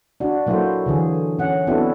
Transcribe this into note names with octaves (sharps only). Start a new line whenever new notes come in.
D4 F#4
F#3 A#3 E4 F#4 A4 C5
D3 E3 G#4
C#4 F#5
B3 C4 D4 E4 F#4 A4